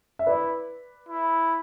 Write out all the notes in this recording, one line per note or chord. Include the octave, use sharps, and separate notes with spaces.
E5
E4 B4 D5
E4